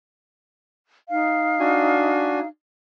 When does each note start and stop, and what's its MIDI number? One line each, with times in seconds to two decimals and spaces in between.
1.10 2.48 63
1.10 2.48 77
1.60 2.39 62
1.60 2.39 66
1.60 2.39 80